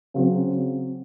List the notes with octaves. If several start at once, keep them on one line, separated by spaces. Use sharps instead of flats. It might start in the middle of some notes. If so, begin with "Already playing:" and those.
C#3 F#3 C4